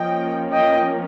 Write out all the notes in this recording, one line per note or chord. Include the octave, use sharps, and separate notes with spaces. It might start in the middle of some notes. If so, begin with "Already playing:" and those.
Already playing: F3 A#3 C#4 D#5 G5
D#5 G5